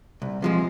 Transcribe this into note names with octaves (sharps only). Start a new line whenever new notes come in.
C2
C3 F3 G#3